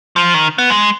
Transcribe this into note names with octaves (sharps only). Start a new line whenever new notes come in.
F3
D#3
B3
G#3